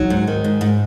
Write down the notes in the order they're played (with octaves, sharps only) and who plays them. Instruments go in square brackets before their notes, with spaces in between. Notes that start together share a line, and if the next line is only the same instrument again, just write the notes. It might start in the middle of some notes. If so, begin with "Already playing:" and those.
Already playing: [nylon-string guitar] F#3 [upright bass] D#4
[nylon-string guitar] G#2
D#3
G#2
G#2